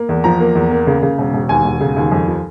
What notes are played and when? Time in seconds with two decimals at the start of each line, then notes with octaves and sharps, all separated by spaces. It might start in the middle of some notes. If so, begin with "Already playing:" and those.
Already playing: A#3
0.09 E2
0.24 F3 A#5
0.40 A#3
0.55 E2
0.71 A#3
0.87 C#3
1.03 C#3
1.18 E1
1.34 E1
1.49 D#2 G#5
1.65 E1
1.81 C#3
1.97 D#2
2.12 F2
2.28 F3